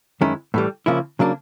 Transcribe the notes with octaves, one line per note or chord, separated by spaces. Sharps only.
F#2 D#3 G#3 C#4 E4
A2 E3 G3
C#3 F3 A#3 C#4 E4
C#3 F#3 A#3 D4